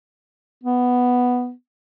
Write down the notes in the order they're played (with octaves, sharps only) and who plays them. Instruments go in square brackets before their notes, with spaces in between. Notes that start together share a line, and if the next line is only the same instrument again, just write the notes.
[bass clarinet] B3